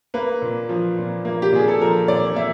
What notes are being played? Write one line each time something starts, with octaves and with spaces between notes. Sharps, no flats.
A#3 B4
A#2
F3
A#2
A#3
G4
A#2 G#4
A4
F3 A#4
A#2 D5
A#3 E5